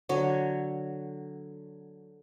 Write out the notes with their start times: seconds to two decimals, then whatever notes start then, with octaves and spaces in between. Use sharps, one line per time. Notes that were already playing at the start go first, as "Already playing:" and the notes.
0.09 D3 F#3 C#5